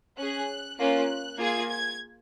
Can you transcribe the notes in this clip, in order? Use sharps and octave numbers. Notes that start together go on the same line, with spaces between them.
C#4 G#4 F#6
A#3 C#4 F4 F#6
A#3 F4 G#4 G#6
G#6